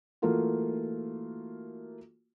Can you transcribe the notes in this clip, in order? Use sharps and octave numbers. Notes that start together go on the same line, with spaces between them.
E3 A3 A#3 F4 F#4